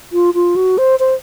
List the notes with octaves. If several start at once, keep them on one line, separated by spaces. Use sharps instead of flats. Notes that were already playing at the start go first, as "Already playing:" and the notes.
F4
F4
F#4
C5
C5